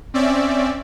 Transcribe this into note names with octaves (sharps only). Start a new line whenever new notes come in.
C4 C#4 D5 E5